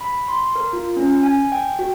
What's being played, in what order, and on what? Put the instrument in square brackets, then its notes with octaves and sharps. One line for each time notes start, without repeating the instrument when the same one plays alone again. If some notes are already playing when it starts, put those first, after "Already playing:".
[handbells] B5
C6
A#4
F4
C#4
G#5
G5
F#4